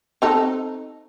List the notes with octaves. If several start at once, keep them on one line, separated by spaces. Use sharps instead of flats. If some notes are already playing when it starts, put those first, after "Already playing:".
C4 D#4 A4